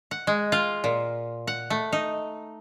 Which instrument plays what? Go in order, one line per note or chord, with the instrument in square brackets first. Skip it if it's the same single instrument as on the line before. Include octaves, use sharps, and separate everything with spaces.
[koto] F#5
G#3
F4
A#2
F#5
A3
D#4